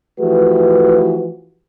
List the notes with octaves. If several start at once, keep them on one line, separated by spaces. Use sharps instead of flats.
E3 F3 A3 F#4 G4 B4